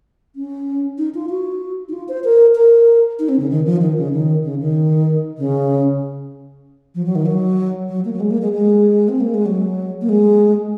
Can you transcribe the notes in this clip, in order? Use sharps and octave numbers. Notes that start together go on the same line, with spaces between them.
C#4
D#4
F4
F#4
D#4
F4
C5
A#4
A#4
D#4
C4
C#3
D#3
F3
D#3
C#3
D#3
C#3
D#3
C#3
F3
F#3
D#3
F#3
F#3
A#3
F#3
G#3
A#3
G#3
G#3
C4
A#3
G#3
F#3
A#3
G#3